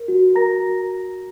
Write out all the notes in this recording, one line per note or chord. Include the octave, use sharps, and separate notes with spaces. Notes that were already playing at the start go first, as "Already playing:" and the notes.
Already playing: A#4
F#4
A#4 A#5 A#6